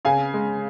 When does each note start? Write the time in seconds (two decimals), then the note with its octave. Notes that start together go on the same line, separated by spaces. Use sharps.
0.05 C#3 F5 G#5
0.34 G#3